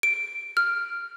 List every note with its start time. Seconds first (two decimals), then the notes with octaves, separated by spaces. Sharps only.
0.03 D7
0.57 F6